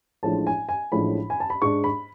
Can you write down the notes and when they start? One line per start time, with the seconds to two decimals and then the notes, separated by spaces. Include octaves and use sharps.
0.23 A1 A2 F3 G#3 D4 A5
0.47 G#5
0.69 G#5
0.92 A1 A2 F3 G#3 D4 B5
1.30 G#5
1.40 A5
1.50 B5
1.62 G#2 G#3 D4 C#6
1.84 B5